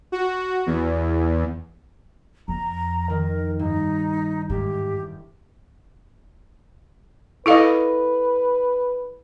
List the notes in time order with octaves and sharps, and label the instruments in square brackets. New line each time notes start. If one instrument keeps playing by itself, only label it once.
[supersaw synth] F#4
E2
[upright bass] F2 [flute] A#5
[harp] D#3 [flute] A#4
[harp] G2 [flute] D#4
[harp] E1 [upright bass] G#2 [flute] G4
[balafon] E4 A4 F5 [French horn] B4 [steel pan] D#5 D6